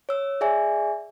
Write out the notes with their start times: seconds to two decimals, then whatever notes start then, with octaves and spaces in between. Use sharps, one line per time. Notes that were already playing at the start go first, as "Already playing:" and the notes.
0.09 C#5 E6
0.41 G#4 D5 E5 G#5